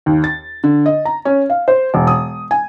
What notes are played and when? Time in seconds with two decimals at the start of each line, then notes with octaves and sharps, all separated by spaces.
0.06 D#2
0.24 A6
0.64 D3
0.86 D#5
1.05 A#5
1.25 C#4
1.50 F5
1.68 C5
1.94 E1
2.07 D#6
2.51 G#5